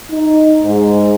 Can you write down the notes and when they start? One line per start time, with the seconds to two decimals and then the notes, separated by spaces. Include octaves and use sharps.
0.11 D#4
0.62 G#2